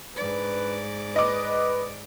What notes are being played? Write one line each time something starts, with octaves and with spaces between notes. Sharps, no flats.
G#2 D4 B4 D5
B4 D#5 D6